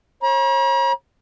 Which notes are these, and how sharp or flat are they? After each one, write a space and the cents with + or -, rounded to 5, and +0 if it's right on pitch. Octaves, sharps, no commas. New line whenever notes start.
C#5 -40 A#5 +45